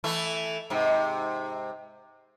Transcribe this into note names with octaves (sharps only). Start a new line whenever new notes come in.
E3 A3 E4
G#2 C3